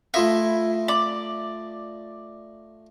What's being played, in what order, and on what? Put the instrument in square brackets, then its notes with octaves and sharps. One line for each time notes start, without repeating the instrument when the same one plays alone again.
[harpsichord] A3 F4 D#5 [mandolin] E4
[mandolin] D5